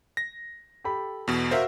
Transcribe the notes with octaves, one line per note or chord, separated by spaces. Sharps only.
A#6
G4 A4 B5
E2 B2
F#4 A#4 C5 E5 F5